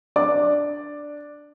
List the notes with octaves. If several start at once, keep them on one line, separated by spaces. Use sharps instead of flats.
D4 D5 D6